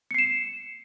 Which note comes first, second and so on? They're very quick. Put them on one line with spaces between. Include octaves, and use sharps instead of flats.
C#7 C7 E7